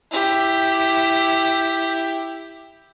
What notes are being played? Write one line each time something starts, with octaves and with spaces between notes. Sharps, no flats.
E4 G4